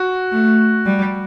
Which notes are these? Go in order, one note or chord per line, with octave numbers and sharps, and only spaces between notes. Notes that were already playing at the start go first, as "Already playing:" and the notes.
Already playing: F#4
A3
G3